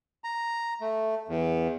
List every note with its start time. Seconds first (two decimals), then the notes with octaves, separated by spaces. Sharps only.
0.24 A#5
0.81 A3
1.28 E2